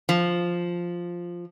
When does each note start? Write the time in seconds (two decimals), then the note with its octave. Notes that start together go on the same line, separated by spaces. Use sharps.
0.09 F3